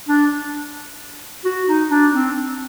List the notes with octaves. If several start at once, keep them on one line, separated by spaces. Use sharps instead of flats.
D4
F#4
D#4
D4
C4